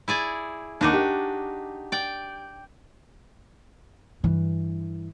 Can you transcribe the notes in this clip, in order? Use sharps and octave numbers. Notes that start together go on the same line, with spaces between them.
E4 G#4 D5
D#2 D4 D#4 F#4 D6
G4
D5 G5
G2 E3